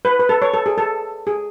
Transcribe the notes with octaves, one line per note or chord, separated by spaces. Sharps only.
B4
B4
A4
C#5
A4
G#4
A4
G#4